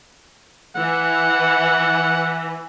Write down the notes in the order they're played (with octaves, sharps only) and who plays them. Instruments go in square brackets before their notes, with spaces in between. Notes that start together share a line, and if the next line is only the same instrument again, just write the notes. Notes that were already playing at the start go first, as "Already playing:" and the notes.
[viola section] E3 [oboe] F#5